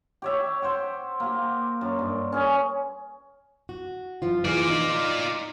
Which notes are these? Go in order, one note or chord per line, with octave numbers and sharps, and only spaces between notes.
G4 C#5 E5
C5 F#5 G5
A#3 G4
F#2
G2
C#4 G#4
F#4
F#2 F3 F4
E3 F3 F4 G#4 D5
D#4